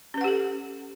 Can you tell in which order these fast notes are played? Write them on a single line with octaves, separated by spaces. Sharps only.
C#4 B4 F#5 G4 A4